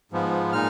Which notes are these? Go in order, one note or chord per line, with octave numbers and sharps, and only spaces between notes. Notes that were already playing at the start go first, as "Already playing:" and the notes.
G#2 F3 B3
A#2 G#3 D#4 F6